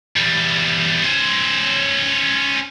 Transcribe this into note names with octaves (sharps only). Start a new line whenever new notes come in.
E2 G3
C#4 C5